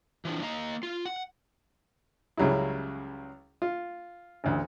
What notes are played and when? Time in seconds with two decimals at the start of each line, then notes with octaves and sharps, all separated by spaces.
0.25 E3 F3 D4
0.42 A#3 D#5 F5 A#5
0.83 F4
1.05 F#5
2.37 C#2 C#3 F#3 G3 E4
3.62 F4
4.44 A1 D2